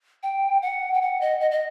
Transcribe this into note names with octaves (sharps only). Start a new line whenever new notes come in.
G5
F#5
G5
F#5
D#5
D#5
D#5